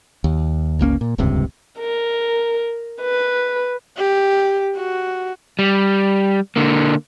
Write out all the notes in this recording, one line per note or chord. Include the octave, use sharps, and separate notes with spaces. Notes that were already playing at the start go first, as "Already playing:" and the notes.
D#2
G1 C#2 A#3 C#4
A#2
D#1 C#2 G2 C3
A#4
B4
G4
F#4
G3
D3 A#3